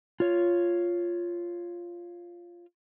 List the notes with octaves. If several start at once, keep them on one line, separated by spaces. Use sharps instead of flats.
F4 C#5